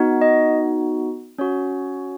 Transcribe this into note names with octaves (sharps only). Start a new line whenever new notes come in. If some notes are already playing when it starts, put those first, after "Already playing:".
Already playing: B3 D#4 F#4
D#5
C#4 F#4 C#5